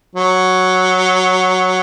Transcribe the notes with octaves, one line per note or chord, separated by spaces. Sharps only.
F#3